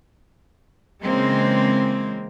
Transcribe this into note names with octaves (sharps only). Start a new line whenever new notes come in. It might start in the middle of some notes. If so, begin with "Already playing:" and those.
C#3 E3 G#3 A#3 C4